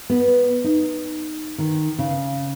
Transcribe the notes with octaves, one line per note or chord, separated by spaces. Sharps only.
B3
D#4
D#3
C#3